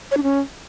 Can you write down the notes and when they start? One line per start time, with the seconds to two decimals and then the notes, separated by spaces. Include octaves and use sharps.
0.11 C#5
0.17 D4
0.23 C#4